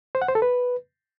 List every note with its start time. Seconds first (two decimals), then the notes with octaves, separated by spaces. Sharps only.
0.15 C5
0.22 F#5
0.28 C5
0.35 A4
0.42 B4